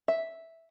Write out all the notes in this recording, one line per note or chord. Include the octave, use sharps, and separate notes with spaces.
E5